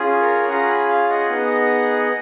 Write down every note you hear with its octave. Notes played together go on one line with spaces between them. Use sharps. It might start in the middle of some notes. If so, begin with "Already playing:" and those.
Already playing: C#4 F4 G#4
A#4 C#5
C#4 F4 G#4 F#5 A#5
G#5 B5
F5 G#5
D#5 F#5
B3 D#4 G#4